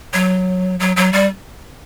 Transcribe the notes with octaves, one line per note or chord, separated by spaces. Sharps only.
F#3
F#3
F#3
G3